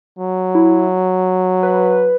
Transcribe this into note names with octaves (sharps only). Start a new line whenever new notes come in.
F#3
E4
B4